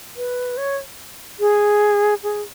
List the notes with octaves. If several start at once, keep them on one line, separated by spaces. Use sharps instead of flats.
B4
C#5
G#4
G#4